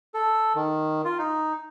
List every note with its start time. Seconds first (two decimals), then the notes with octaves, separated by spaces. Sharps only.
0.14 A4
0.55 D#3
1.05 F4
1.18 D#4